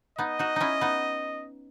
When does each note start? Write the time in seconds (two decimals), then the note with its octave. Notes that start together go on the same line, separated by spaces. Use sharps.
0.19 B3 D#4 D#5
0.39 D#4 F#4
0.56 C#4 D#4 E4
0.81 B3 D#4